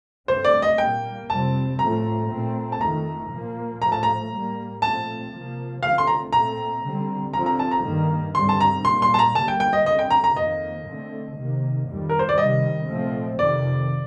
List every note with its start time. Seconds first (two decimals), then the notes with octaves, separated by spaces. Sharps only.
0.28 G2 D3 A3 C4 C5
0.45 D5
0.62 D#5
0.78 A#2 G3 A#3 G5
1.30 F2 C3 G3 C4 A5
1.79 A2 F3 A3 C4 A#5
2.30 A#2 A3 C4
2.72 A5
2.80 F2 D#3 A3 A#5
3.31 A#2 F3 A#3
3.81 A2 F3 A3 A#5
3.92 A5
4.03 A#5
4.32 A2 G3 A#3
4.82 A#2 F3 A3 C4 A5
5.32 C3 F3 A#3
5.82 D3 F3 A3 C4 F5
5.98 C6
6.07 A#5
6.33 A#2 A3 C4 A#5
6.84 D3 G3 C4
7.34 D3 F3 C4 A#5
7.46 A#5
7.59 A5
7.71 A#5
7.84 G2 D#3 A#3
8.35 G2 D3 G3 C4 C6
8.49 A5
8.61 A#5
8.85 A#2 G3 A#3 C6
9.02 C6
9.14 A5
9.19 A#5
9.35 D3 G3 A#3 A5
9.48 G5
9.60 G5
9.73 D#5
9.86 D3 G3 C4 D#5
9.99 G5
10.11 A#5
10.24 A#5
10.36 F2 D#3 A#3 D#5
10.87 D3 A3 C4
11.37 C3 D#3 A#3
11.87 F2 D#3 G3
12.09 A#4
12.19 C5
12.29 D5
12.38 C3 D#3 G3 D#5
12.88 A#2 F3 A3 C4
13.39 F2 C3 D#3 D5